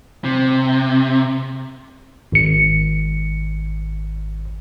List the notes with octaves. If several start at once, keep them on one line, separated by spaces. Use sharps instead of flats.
C3
G#1 C#7